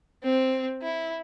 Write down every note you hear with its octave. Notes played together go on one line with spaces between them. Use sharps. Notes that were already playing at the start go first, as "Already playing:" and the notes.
C4
E4